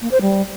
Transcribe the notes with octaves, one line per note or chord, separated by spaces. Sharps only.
A#3
C5
G3